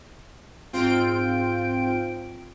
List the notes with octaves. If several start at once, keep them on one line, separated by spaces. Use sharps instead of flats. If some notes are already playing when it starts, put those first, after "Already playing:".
G#2 C4 F4 G5 D7